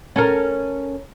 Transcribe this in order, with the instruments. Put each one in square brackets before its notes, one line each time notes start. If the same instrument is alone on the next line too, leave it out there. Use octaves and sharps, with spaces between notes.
[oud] C#4 A4 A#4